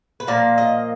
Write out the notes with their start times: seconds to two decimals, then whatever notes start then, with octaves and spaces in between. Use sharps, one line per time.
0.20 B4
0.27 A#2 F3 A#3 D5
0.58 D#5